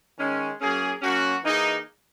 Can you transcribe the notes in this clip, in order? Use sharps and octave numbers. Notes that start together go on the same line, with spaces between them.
D#3 G#3 C#4
F#3 A#3 C#4 G#4
F#3 A#3 C#4 F#4
E3 A#3 D#4 G#4